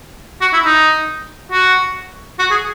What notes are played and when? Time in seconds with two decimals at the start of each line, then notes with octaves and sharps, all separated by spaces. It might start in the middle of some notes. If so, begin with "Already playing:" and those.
0.41 F#4
0.53 E4
0.65 D#4
1.52 F#4
2.39 F#4
2.51 G#4